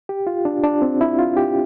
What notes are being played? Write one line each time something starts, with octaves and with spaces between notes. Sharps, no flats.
G4
F4
D4
D4
C4
E4
F4
G4